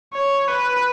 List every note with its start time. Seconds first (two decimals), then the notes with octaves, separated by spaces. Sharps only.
0.14 C#5
0.48 B4